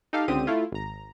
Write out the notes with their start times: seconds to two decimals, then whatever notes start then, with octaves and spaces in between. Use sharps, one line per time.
0.13 D#4 G4 A4 F5
0.28 C#2 D3 C4 G4 D#6 D#7
0.47 A3 E4 F4
0.72 G#1 A#5